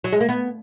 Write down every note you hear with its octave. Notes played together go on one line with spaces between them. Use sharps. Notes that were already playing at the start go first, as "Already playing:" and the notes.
F#3
G#3
A#3
B3